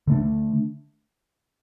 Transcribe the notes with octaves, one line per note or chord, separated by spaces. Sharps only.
D3 A3 D4